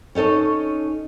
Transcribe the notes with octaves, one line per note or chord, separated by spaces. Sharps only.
C#4 D#4 A4 C#5 D#5